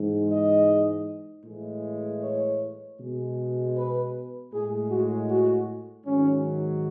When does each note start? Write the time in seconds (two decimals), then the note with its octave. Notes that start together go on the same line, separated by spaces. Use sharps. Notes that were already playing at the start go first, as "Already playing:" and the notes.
Already playing: G#2 E3 G#3
0.30 D#5
1.45 A2 E3 G#3
2.22 C#5
2.98 B2 G#3
3.75 B4
4.53 A2 G#3 G#4
4.91 F#4
5.29 F#4
6.06 G#2 D#3 F#3 C#4